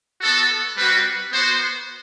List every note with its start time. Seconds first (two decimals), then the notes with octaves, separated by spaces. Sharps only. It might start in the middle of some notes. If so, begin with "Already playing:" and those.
0.21 B3 F#4 A4
0.77 G3 C4 F#4 B4
1.33 B3 F#4 C5